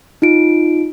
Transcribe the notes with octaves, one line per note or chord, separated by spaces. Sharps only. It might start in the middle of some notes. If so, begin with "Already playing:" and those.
D#4 F4 D7